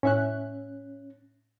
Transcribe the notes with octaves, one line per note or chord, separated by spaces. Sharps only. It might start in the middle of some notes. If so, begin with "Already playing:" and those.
A2 C#4 E5 F#6